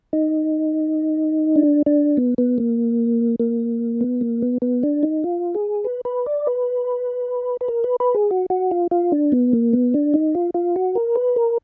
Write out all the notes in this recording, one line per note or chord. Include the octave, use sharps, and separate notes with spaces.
D#4
D4
D4
B3
B3
A#3
A#3
B3
A#3
B3
B3
D4
D#4
F4
G#4
B4
B4
D5
B4
B4
A#4
B4
B4
G#4
F#4
F#4
F4
F4
D4
B3
A#3
B3
D4
D#4
F4
F4
F#4
A#4
B4
A#4